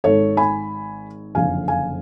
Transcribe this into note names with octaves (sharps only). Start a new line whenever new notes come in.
G#1 G#2 A4 C#5
G#5 B5
F#1 F2 D3 F5 G#5
F5 G#5